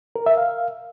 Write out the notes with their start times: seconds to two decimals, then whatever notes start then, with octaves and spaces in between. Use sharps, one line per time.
0.16 A#4
0.26 E5
0.37 F5